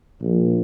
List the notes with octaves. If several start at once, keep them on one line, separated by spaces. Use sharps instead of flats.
A#1